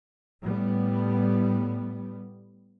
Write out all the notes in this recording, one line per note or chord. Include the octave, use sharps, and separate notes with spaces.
A2 G3 B3